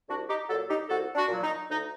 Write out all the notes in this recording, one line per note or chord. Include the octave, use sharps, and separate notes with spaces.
C2 D4 F#4
D#4 G4
A#2 F#3 F#4 A4
D#4 G4
C2 F#4 A4
D4 F#4
A#2 F#3
D#4
D2 D#4